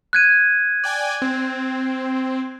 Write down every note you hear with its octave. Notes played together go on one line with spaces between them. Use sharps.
F#6 G#6 D#7
D5 G5 G#5
C4